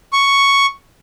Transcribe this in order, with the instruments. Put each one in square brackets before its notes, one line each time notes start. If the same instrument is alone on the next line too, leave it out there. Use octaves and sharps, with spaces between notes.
[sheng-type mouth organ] C#6